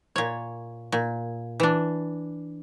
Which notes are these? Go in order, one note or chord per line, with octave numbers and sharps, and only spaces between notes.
A#2 C#5
A#2
E3 D4